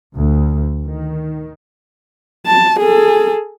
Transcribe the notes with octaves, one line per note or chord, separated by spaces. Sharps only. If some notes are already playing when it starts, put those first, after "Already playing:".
D2
D#3
A5
G#4 A4